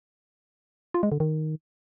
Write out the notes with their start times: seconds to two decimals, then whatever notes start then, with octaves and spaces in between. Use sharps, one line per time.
0.94 F4
1.03 G#3
1.12 D3
1.20 D#3